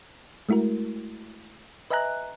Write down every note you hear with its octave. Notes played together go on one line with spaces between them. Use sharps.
G#3 A3 E4 F#4 A#4
B4 D#5 E5 G#5 A#5 F#6